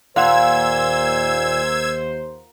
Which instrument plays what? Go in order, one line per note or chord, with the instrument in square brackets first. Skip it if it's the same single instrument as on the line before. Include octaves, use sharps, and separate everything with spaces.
[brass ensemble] D#2 C5 [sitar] A#2 [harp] F5 F#5 C6 [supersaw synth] E6 G#6